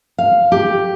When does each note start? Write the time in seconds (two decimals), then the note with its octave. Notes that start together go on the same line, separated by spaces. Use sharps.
0.18 F5
0.52 G4